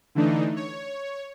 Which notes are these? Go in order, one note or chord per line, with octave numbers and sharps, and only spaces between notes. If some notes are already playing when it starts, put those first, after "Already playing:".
D3 E3 A3 D4 D#4
C#5